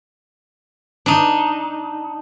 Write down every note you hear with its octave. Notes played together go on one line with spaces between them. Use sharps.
D4 D#4